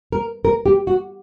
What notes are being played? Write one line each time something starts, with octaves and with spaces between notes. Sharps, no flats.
A#4
A#4
G4
F#4